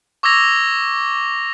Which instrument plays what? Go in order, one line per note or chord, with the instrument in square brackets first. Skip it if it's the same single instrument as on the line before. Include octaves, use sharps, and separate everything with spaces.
[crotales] C#6 D6 E6 G#6 A#6 F7